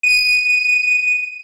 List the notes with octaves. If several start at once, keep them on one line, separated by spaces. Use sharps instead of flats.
D#7